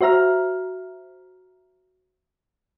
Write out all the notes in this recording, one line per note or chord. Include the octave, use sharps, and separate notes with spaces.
F#4 C5 E5 A#5 F6